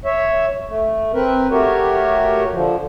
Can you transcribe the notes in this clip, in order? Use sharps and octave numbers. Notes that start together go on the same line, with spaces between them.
C#5 E5
A3
C4 A#4 B4
A3 F#4 G4 A#4 C#5
D3 F3